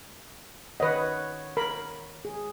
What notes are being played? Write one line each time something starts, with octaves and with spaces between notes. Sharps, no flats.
D#3 B4 C#5 D#5 F#5
A#4 B5
G#4